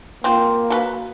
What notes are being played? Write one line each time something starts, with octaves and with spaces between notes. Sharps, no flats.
A#3 C4 F4
F#3 A4 B4